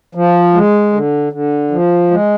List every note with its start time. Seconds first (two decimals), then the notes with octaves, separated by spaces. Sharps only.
0.15 F3
0.54 G#3
0.93 D3
1.33 D3
1.71 F3
2.11 G#3